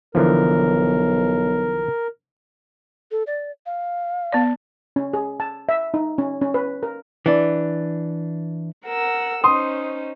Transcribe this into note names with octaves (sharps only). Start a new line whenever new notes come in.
B1 D3 E3 F3 A#4
A4
D5
F5
B3 D5
C#4
G#4
A5
E5
D#4
C#4
C#4
B4
A#4
E3 D4
A#4 F#5 E6
C#4 D#4 C5 C6 D#6